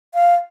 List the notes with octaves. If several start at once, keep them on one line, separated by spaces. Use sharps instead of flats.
F5